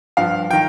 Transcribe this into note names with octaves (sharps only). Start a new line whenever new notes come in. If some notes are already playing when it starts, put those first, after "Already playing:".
G2 F3 F5
D#3 G5